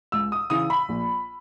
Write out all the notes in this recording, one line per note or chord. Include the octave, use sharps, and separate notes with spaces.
C#2 E6
D#6
C#3 E3 D#6
B5
A#1